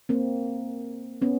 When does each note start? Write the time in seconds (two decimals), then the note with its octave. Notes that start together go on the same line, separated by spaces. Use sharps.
0.09 A#3 C4
1.22 B3 C#4